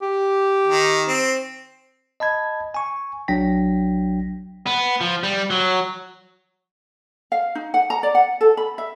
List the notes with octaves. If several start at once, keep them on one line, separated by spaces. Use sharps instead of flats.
G4
D#3
C4
D#5 A5 B5 G#6
G#5 C#6
A#1 F#3 D4 G5 A#6 B6
B3
F3
G3
F#3
F5
D#4
F#5
A#5
D5
F#5
A4
B5
E5